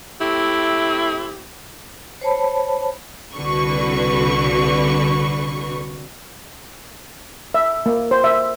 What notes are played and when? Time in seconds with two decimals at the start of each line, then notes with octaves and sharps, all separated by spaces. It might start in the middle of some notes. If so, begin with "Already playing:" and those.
0.20 A3 C4 E4 G4
2.21 C5 C#5 A5 B5
3.36 C2 D3 F#4 B4 C#6
7.54 E5
7.86 A#3
8.11 C5
8.24 E5